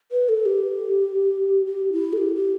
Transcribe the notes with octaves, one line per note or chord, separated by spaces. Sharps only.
B4
A4
G4
G4
E4
A4
G4
G4